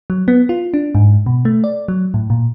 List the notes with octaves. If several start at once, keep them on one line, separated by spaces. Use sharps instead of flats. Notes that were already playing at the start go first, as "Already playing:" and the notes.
F#3
B3
F4
D4
G#2
B2
A3
D5
F#3
A2
A#2